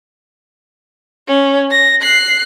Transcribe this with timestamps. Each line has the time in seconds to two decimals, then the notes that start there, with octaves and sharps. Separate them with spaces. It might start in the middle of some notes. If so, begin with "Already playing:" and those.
1.28 C#4
1.71 A#6
2.02 F#6 C7